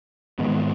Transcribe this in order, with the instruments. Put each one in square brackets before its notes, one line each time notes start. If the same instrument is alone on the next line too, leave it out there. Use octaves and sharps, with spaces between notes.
[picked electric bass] G#2 D#3 G#3 B3